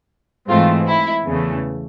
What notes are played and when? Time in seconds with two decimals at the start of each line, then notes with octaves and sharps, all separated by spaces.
0.48 G#2 E3 A3 C4 F4
0.87 E4
1.25 E2 C#3 E3 A3